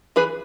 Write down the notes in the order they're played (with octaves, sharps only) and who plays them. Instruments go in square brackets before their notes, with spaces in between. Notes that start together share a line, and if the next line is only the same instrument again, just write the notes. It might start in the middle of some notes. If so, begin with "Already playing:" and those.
[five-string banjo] E3 G#4 B4